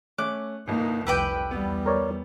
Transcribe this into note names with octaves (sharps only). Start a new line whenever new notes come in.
A3 C#4 D6 F#6
G1 C2 A#3 D#4
F1 C2 G4 B4 G5 D6 E6
E2 G3 B3
A#4 C#5 D5